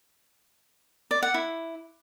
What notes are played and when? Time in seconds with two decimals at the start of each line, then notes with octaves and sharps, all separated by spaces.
1.11 D5
1.23 F#5
1.34 E4